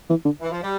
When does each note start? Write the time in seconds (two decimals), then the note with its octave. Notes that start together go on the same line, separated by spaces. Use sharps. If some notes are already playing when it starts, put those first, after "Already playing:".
0.10 E3
0.25 D3
0.41 E3
0.52 F3
0.62 G3